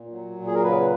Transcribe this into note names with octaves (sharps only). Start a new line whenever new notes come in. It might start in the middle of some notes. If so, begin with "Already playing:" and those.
Already playing: A#2
F#3
A#2
G#4
A#4
C#3 B4